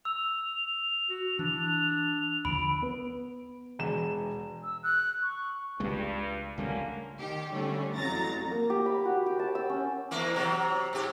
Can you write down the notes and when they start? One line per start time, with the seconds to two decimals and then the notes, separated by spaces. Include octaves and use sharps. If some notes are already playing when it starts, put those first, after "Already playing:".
0.05 E6 F7
1.10 F#4
1.39 E3 D4
2.45 D#2 D3 F3 B5 D7
2.82 B3 B4
3.79 E1 E7
4.64 E6
4.83 F#6
5.22 C#6
5.80 C#2 G2 G3 G#3
6.58 C#2 D3 G3 A3 A#3 C#4
7.18 D#3 G4
7.50 D3 G3 A3 C#4
7.96 A1 F2 F#3 A#5 A6 A#6
8.51 A#3
8.70 G4
8.86 B5
9.05 F#4
9.26 G4
9.39 A5
9.55 E6
9.70 C#4
10.11 E2 A#3 E4
10.34 C3 F#3
10.93 G#2 G4